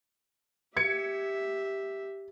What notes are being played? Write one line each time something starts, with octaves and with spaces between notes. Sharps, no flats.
G4 E5 G#6 C#7